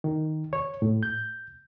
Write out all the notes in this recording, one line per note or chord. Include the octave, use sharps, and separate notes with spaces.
D#3
C#5
A2
G6